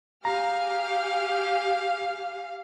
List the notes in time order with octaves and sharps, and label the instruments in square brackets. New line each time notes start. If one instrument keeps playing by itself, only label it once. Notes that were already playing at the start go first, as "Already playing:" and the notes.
[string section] G4 G#4 F6 [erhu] F5 [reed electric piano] A#5